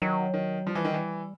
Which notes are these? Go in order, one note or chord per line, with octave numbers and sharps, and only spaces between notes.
D#3 F#3
D#3
F3 G3
E3
D#3
E3